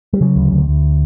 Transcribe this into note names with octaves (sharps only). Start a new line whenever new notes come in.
G3
C#3 F#3
D2
D2
D2